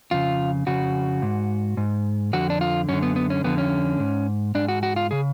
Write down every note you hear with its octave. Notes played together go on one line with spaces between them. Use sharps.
F2 C#3 F4
F2 C#3 F#4
G#2
G#2
F2 D3 F#4
D4
F4
F#2 D3 C#4
B3
B3
C#4
F2 D3 B3
C#4
G#2
G#2 D4
F#4
F#4
F4
C#3 G#4